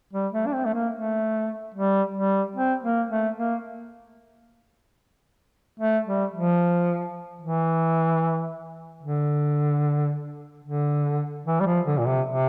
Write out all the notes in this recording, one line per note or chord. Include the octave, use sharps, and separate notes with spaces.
G3
A3
D4
C4
A3
A#3
A3
G3
G3
C4
A#3
A3
A#3
A3
G3
F3
E3
D3
D3
E3
G3
F3
D3
A#2
C3
C3